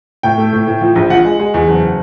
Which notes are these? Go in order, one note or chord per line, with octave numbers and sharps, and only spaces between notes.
A2 G5
A3
A2
A2
F3
A#1
F3 F#5
G#3
G#3
E2
F#1